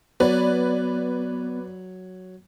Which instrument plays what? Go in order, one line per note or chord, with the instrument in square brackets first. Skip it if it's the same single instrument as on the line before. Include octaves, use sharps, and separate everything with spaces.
[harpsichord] F#3 [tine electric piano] B3 [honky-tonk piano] B4 D5